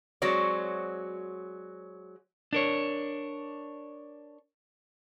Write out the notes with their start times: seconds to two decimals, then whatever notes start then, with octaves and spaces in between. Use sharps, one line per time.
0.22 F#3 G#3 C4 F#4 C#5 D5
2.53 D4 A#4 C#5